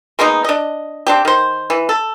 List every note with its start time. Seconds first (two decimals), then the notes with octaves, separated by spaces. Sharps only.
0.19 G#3 A#3 B3 D#4
0.44 D4 D#5
1.07 C4 D4 G4
1.25 D#3 C5
1.70 E3
1.89 A4